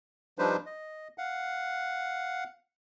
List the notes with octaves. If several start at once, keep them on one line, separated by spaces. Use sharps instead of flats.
F3 G3 D4 D#4 B4 C5
D#5
F5 F#5